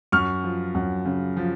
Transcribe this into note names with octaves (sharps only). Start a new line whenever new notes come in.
F#2 C#6 F6
F3
F#2
C#3
F3